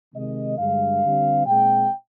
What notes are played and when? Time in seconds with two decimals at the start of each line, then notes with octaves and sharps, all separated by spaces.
0.15 C3 D#3 G#3 D#5
0.58 G2 D3 G#3 F5
1.03 D3 G3 C4
1.46 A#2 G#3 C4 G5